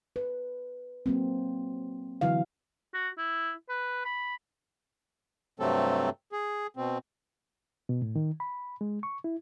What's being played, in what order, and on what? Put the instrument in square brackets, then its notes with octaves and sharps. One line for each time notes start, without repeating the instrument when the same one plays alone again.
[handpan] B4
F#3 A#3 C4
D3 E3 F#3 E4 F5
[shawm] F#4
E4
B4
B5
[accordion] G2 C3 F#3 A3 C4 A4
G#4
B2 C4
[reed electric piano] B2
A2
D#3
B5
G#3
C#6
E4